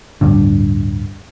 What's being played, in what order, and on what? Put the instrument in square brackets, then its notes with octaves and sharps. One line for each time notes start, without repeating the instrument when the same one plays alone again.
[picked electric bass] D1 G2 D3